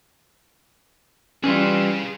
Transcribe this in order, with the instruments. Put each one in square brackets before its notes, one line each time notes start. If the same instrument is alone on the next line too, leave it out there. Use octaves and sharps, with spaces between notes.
[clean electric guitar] E3 G3 F4 [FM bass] C#4 [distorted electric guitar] G#4 F5